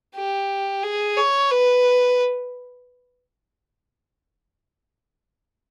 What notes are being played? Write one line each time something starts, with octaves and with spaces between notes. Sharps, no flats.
G4
G#4
C#5
B4